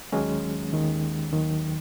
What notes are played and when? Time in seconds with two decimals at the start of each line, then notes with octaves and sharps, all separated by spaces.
0.12 D#2 D#3 F#3 G#3 C#4
0.72 D#2 D#3 G#3
1.32 D#2 D#3 F#3